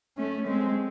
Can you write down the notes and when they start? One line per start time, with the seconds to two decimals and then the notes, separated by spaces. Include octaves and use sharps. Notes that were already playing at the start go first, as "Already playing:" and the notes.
0.17 A3 C#4
0.47 G#3 C4